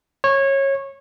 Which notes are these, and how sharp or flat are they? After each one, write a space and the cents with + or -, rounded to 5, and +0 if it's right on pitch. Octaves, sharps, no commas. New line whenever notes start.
C#5 -20